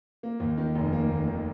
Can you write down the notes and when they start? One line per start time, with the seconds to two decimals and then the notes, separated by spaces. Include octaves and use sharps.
0.23 A#3
0.40 D#2
0.58 D#3
0.75 F1
0.93 A#3
1.10 D#2
1.27 D#3